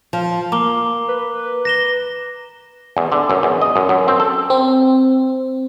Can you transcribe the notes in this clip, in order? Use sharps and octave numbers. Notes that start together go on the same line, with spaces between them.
F3
A#3 A#5 D6 G7
B4
A#6 E7 G7
E2
D3
F#2
E2
D#5
F#2
F#2
C4
A4
C4